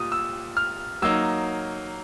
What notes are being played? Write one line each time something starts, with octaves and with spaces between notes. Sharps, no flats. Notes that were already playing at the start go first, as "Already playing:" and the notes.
Already playing: A#2 G3 D#6
E6
F6
F#3 A#3 D#4 E6